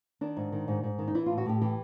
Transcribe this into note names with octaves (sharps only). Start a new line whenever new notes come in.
D#3 D4
G#2
D#3
G#2
G#2
D#3
D#4
E3 E4
F4
A2
F#4
A2 G4
E3 G4